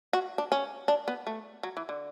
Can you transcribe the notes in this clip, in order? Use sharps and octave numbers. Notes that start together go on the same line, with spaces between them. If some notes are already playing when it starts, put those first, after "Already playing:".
F#4
D4
C#4
D4
B3
A3
F#3
E3
D3